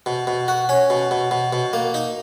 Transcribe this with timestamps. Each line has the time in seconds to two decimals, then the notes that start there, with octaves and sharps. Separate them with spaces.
0.06 B2
0.27 B2
0.48 F#4
0.69 C#4
0.90 B2
1.11 B2
1.31 B2
1.53 B2
1.73 A#3
1.94 D#4